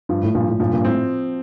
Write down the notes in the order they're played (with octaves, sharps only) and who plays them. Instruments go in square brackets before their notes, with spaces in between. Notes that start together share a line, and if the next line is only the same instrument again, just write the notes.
[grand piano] G2 [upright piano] F3
[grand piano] A2
[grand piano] G2 A#2 [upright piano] F3
[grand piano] A2
[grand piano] G2 A#2 [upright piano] F3
[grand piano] G2 A#2
[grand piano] A2 [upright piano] C4